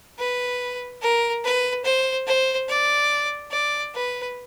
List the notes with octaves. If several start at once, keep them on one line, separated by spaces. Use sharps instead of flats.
B4
A#4
B4
C5
C5
D5
D5
B4